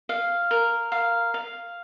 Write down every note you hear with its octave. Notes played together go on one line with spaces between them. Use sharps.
F5
A#4
F5
F5